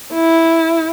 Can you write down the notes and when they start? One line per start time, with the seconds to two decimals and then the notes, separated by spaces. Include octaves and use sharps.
0.14 E4